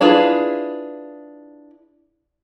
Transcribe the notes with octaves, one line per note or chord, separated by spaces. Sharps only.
D4 E4 F4 G#4 B4